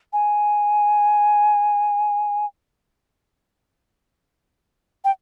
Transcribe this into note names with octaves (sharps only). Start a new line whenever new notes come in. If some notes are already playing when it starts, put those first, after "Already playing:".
G#5
G5